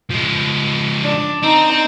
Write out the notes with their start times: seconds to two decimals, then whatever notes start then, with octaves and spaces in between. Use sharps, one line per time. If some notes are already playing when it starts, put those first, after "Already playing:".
0.10 F3 G#3
1.05 D4
1.43 C4 D#4